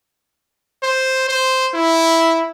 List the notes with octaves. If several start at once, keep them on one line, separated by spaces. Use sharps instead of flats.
C5
C5
E4